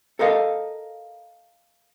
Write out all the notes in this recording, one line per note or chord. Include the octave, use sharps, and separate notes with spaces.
A4 A#4 D#5 F5